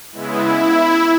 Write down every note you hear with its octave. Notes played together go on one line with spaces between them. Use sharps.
C#3 G#3 B3 E4